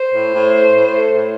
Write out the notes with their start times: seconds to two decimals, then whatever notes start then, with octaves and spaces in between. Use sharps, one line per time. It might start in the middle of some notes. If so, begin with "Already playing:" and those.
Already playing: C5
0.13 A2
0.33 A2
0.53 A3
0.72 A2
0.93 A3
1.12 A2